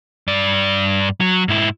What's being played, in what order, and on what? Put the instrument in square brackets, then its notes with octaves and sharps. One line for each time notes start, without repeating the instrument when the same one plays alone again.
[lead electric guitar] G2 D5
F#3
G#2 E4